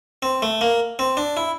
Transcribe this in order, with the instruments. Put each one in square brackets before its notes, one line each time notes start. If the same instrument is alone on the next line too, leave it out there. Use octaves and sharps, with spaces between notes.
[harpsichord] C4
A3
A#3
C4
D4
E4